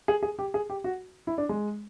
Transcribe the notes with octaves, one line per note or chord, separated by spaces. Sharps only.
G#4
G#4
G4
G#4
G4
F#4
E4
D4
G#3